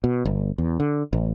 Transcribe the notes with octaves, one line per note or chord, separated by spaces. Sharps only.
B2
G1
E2
D3
A1